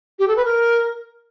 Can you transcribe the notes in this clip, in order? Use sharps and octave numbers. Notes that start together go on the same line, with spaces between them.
G4
A4
B4
A#4